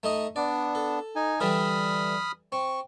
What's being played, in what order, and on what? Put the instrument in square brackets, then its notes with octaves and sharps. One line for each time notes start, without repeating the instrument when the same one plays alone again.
[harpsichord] A3 D#4 D#5
[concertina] B3 D4 [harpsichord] D5
[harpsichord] A4
[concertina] D#4 G#5
[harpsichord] D3 E3 G3 [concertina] B5 D#6 F6
[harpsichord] C4 [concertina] C#6